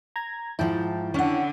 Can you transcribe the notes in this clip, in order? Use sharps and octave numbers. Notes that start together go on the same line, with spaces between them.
A#5 G#6
G#2 F3 E4 G5 A5
D3 C#4 F#5